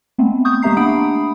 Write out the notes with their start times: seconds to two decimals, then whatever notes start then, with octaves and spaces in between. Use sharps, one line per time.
0.18 G#3 A3 B3 C4
0.45 C#6 D#6 G6
0.63 G#3 A#3 G4 E5 A#5 C7
0.77 A3 D4 F#5 B5 D#6 D7